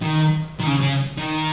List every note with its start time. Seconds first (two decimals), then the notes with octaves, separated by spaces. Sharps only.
0.02 D#3
0.60 D#3
0.67 C#3
0.81 C#3
1.18 D#3